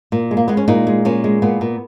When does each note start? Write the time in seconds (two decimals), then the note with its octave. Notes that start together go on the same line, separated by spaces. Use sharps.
0.12 A#2
0.31 G#3
0.37 A#3
0.48 G#3 B3
0.57 C#4
0.68 A#2 D#4
0.87 G#3
1.05 A#2 C#4
1.24 G#3
1.42 A#2 B3
1.61 A#2